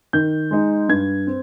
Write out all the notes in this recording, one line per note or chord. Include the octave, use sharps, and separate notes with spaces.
D#3 G6
G#3 D#4
G2 G#6
C4